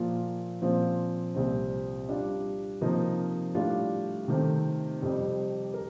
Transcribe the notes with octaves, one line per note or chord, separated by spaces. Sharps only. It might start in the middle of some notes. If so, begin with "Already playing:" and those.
Already playing: A#2 F3 A#3 F4
A#2 F3 C4 F4
C2 A#2 G3 C4
G3 D4 F4
C3 F3 A#3 D#4 A#4
A2 G3 D4 F4
C3 D#3 A3 C4
F2 C3 G3 C4
A#4